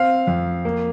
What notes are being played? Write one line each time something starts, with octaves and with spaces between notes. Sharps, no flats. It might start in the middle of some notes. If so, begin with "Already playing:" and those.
Already playing: C4 F5
F2
A#3